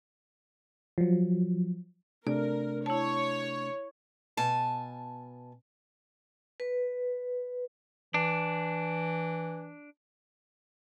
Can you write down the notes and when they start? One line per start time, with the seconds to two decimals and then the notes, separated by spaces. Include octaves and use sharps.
0.98 F3 F#3
2.27 C3 A3 D4 A#4 D5
2.86 E4 C#5 A5
4.37 B2 G#5 A5
6.60 B4
8.14 E3 D4